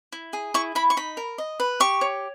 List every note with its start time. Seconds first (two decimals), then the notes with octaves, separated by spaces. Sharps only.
0.12 E4
0.33 G#4
0.54 E4 C#6
0.75 E4 B5
0.90 C#6
0.97 D#4 B5
1.17 A#4
1.38 D#5
1.60 B4
1.80 G4 C#6
2.01 C#5